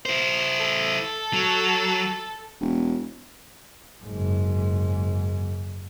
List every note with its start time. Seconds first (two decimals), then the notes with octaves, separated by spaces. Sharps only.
0.06 E4 C5
0.60 A4
1.34 F#3
2.61 E1
4.03 F#1 G#2